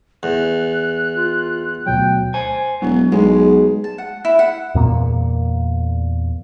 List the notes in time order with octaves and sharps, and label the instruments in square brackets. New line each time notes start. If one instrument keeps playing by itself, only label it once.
[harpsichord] E2 [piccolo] F#6
[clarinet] F4
[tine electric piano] D2 B2 F#3 [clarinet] G5
[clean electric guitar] C5 G#5
[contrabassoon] E1 [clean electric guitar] F#3
[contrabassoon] B1 [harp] G#3
[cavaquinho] A5
F#5
E4
F#5
[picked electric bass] E2 A#2 A#3